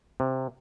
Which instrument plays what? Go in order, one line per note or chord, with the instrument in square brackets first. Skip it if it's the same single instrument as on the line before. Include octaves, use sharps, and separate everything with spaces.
[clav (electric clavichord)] C3